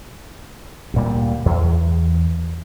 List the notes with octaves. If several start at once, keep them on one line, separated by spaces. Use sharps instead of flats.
D2 A#2 G3
E2